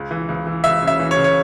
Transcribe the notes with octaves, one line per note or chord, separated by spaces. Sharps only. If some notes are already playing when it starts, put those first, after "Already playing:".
Already playing: C#2
E3
C#2
E3
C#2 E5
C#3
E5
E3
C#5
C#3
C#5